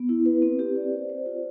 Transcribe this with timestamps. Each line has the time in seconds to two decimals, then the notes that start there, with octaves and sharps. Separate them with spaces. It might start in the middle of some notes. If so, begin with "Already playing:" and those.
Already playing: B3
0.09 E4
0.26 B4
0.42 C4
0.59 G4
0.76 D5
0.93 C5
1.09 C5
1.26 F4